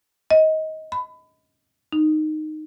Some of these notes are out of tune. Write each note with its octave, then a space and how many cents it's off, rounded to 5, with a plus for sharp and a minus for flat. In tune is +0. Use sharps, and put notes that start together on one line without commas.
D#5 +20
B5 +25
D#4 -10